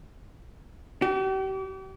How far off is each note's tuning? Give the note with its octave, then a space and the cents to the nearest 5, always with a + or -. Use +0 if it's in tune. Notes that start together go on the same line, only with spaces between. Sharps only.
G4 -40